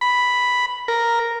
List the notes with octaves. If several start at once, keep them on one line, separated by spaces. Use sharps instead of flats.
B5
A#4